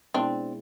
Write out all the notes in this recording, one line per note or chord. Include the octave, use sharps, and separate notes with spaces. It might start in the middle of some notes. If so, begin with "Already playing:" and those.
B2 G#3 B3 C4 D4 E4